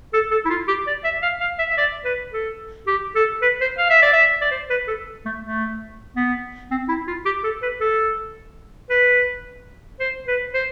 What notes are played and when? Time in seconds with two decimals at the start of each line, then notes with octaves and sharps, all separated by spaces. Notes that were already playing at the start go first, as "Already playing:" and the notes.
0.13 A4
0.31 A4
0.45 E4
0.50 F4
0.67 G4
0.87 D5
1.04 E5
1.22 F5
1.41 F5
1.59 E5
1.71 E5
1.77 D5
2.05 B4
2.33 A4
2.87 G4
3.15 A4
3.42 B4
3.61 C5
3.78 F5
3.90 E5
4.02 D5
4.13 E5
4.41 D5
4.51 C5
4.70 B4
4.87 A4
5.25 A3
5.42 A3
6.16 B3
6.71 C4
6.88 E4
7.07 F4
7.25 G4
7.44 A4
7.62 B4
7.81 A4
8.90 B4
10.00 C5
10.27 B4
10.54 C5